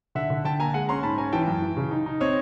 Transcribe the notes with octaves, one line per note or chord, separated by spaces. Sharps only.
D3 E5 F#5
D3
D3 G5 A5
A#3 G#5 A#5
G#3 F#5 G#5
C#4 A#5 C6
G#2 A5 B5
C#4 G#5 A#5
E3 G5 A5
F#2
E3
C#3
D#4
D#4
C4 C#5 D#5